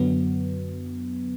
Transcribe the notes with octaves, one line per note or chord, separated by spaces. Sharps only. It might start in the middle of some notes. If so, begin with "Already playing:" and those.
Already playing: F#2 D3 F#3 B3